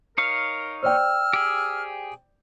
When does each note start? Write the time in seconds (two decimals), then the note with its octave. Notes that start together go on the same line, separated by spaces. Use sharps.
0.18 D#4 A#4 C#5 F5
0.83 C5 D5 G5 E6 F6
1.33 G4 G#4